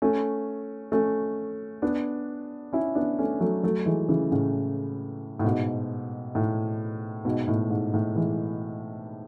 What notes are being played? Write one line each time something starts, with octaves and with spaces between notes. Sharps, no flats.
A3 C#4
A3 C#4
B3 D4
C#4 E4
B3 D4
A3 C#4
F#3 A3
F#3 A3
E3 G#3
C#3 E3
A2 C#3
A2
G#2 B2
A2
G#2 B2
A2
G#2
A2
E3 G#3